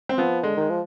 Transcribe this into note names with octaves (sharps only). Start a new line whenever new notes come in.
C4
F3 B3
D3 G#3
D#3 G#3
F3